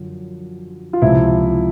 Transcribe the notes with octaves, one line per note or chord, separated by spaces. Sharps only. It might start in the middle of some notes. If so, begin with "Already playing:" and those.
Already playing: F#2 D3 F3
F4
C#2 C3 F3 E4